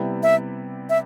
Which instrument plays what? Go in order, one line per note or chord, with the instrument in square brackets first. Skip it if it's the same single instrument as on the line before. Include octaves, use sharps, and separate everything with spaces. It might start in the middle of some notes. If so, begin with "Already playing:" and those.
Already playing: [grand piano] C3 G3 B3 E4
[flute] E5
E5